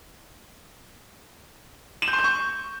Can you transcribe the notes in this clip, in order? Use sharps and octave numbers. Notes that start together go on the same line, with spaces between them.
E7
G6
C6
G6
C#6